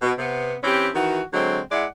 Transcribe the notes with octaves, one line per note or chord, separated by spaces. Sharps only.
B2
C3 B3
E3 C4 C#4 G4
D#3 E3 F#4
D3 F#3 G#3 C4
G#3 E4 D5 F#5